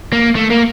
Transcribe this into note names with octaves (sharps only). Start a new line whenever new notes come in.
A#3
A3
A#3